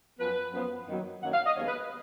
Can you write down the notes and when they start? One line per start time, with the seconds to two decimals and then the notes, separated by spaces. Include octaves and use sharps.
0.19 F#2 F3 B3 B4
0.53 F#2 F3 B3
0.88 F#2 D#3 F#3 A#3
1.22 F#2 D#3 F#3 A#3 F#5
1.33 F5
1.45 D#5
1.56 D#2 C#3 G#3 B3 C#5
1.68 B4